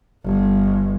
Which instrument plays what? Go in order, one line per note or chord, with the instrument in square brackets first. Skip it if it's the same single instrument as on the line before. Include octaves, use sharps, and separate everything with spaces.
[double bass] G1